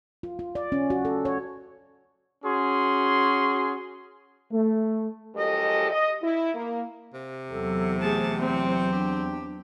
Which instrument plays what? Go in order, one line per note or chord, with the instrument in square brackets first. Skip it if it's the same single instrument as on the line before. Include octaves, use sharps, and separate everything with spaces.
[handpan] F4
F4
D5
C#4
F#4
A4
C#5
[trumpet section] C#4 F#4 G#4 C6
[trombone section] A3
[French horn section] F#2 F3 G#3 G4 A4 D#5
D#5
E4
A#3
[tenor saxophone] C3
[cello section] E2 F#3 [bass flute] A4
[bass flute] A3 [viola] G#4 A5
[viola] C4
[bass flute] D4 [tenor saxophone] G4